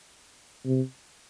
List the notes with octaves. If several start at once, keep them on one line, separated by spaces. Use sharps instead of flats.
C3